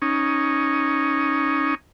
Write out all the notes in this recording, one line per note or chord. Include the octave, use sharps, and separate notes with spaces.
C#4 D#4